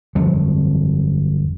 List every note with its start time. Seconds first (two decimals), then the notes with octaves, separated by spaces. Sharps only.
0.15 G1 F2 F3 F#3